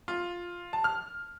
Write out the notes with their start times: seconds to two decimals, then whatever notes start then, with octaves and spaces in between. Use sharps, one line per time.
0.08 F4
0.73 A5
0.84 F6